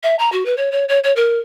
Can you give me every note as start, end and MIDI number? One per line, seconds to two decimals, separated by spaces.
0.03 0.15 76
0.19 0.31 82
0.32 0.45 66
0.45 0.54 71
0.57 0.71 73
0.71 0.84 73
0.88 0.99 73
1.04 1.12 73
1.16 1.38 70